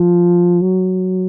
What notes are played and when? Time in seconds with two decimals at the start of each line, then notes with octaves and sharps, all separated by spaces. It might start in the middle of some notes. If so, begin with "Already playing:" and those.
Already playing: F3
0.62 F#3